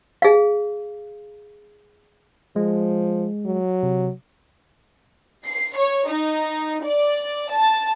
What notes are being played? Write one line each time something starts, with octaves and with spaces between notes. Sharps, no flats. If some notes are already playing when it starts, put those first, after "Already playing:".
G#4 F5
F3 G#3
F#3
C3
C7
C#5
D#4
D5
A5